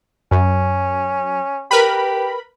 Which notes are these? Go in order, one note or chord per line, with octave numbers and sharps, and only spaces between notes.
F#2 C#4
G4 A#4 B4 B5